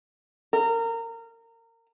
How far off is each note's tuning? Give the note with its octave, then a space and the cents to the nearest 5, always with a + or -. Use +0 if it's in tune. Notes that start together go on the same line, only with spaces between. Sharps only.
A#4 -25